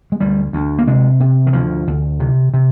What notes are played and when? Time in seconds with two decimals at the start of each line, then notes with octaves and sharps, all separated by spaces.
0.12 G#3
0.20 D2 G3
0.53 D2
0.79 A#3
0.87 C3 G#3
1.20 C3
1.47 D#3
1.53 D2 F3
1.87 D2
2.20 C3
2.54 C3